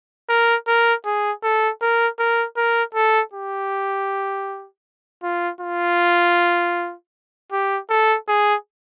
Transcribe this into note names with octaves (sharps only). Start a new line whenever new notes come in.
A#4
A#4
G#4
A4
A#4
A#4
A#4
A4
G4
F4
F4
G4
A4
G#4